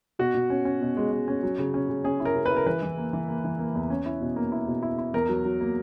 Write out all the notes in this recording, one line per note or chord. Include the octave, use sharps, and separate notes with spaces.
B2 F#4
B2
C#4
C#4
B2
G#3
G#3
C#4
F#3
C#3
C#4
C#3
C#4 G#4
E4
A#4
C#3
E4 B4
A#4
E3 B4
E3
A#3
E3
A#3
E3
A#3
E2
C#4
E4
B2
A#3
E4
B2
E4
E4
E2 A#4
F#3
F#3
A#3